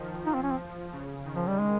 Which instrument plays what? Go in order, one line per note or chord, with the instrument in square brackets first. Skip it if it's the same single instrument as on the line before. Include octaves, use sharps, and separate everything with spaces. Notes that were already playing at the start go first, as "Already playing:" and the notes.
Already playing: [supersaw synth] D#3 F3
[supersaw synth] F3 [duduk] D#4
[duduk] C4
C#4
C4
[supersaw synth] C#3
D#3
[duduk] F3
G3
G#3